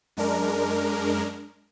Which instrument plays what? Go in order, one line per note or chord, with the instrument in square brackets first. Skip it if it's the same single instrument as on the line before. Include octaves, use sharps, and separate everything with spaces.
[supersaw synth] F#2 G#3 D4 A#4